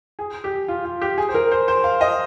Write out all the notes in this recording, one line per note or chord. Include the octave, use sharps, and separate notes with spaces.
G#4
G4
F4
F4
G4
G#4
C5
A#4
C5
C5
F5
D#5